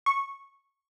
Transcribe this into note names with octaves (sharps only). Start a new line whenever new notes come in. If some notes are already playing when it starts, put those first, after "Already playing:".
C#6